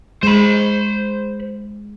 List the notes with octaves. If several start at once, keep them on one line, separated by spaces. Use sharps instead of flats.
G#3 C5 B5